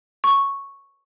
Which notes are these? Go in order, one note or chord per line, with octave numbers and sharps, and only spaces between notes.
C#6